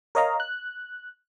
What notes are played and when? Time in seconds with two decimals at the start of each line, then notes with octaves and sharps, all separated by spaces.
0.15 A#4 C#5 D#5 F5 A#5
0.40 F#6